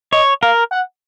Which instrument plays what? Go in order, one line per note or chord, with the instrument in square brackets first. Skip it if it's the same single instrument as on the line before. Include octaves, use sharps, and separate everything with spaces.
[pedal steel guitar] C#5 [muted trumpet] D#5
[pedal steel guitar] A#4 [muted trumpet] F5
[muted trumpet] F#5